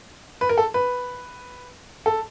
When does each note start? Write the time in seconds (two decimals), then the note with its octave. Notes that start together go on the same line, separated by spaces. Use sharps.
0.41 B4
0.49 A#4
0.58 A4
0.74 B4
2.06 A4